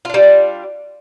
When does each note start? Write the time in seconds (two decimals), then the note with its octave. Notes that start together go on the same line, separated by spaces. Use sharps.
0.05 F4
0.09 D4
0.14 G3